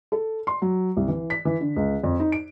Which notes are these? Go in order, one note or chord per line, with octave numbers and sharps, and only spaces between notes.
A4
C6
F#3
C2
E3
B6
E3
D3
C#2
F2
D#4
D7